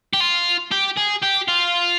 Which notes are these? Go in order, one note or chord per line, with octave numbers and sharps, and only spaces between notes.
G4
F4
G4
G#4
G4
F4